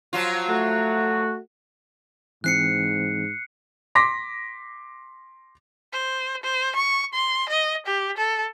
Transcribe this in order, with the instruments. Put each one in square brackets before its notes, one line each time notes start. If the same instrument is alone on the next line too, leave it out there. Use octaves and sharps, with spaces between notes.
[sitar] F3 F#3 F4
[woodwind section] A3 F#4
[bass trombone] G#2 [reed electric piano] E3 C4 [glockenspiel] F#6 C7 C#7
[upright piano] C6 D6 A#6 B6
[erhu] C5
C5
C#6
C6
D#5
G4
A4